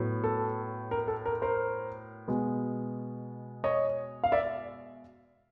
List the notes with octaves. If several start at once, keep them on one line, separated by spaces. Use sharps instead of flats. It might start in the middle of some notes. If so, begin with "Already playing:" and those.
Already playing: A2 F#3 B3
A4
A#4
A4
A#4
A#4 C5
B2 G#3 B3
C#5 D#5
F5
D5 E5